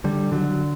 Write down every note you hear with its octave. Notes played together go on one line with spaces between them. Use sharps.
D3 G3
D3 F#3